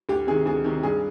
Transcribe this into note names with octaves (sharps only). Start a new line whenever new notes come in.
D2 G4
C3 D#3 G#4
D2 G#4
C3 D#3
G2 G#4